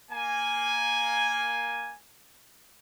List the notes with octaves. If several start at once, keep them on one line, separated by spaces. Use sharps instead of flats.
A#3 G#5